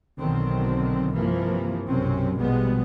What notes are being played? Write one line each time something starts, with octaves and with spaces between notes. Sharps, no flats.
B1 B2 D3 D#3 F#3 C4
G2 C3 E3 F3 A#3
B1 F#2 C3 C4 C#4
A#1 B2 F3 G3 G#3 B3